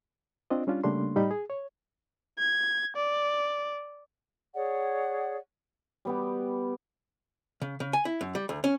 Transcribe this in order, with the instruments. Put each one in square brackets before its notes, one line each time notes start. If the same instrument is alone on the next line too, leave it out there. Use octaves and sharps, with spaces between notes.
[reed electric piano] C4 D4 F4 D#5
G3 C#4 D4 F4
C#3 G3 A3 A#3 D4 C6
A2 G3 D#4 D#5 B5
G#4
C#5
[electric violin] G#6
D5
[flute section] G#4 C#5 D5 F#5
[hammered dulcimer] G3 B3 G4
[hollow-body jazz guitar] C#3
C#3
G#5
E4
F#2
G3
D2
C#4